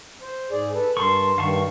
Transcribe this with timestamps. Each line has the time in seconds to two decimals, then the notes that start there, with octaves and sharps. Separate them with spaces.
0.22 C5
0.51 G#2 G#4 D5
0.74 A4 B4
0.97 G2 A#4 A5 C6 C#6
1.38 G2 D#3 F5 A5 C#6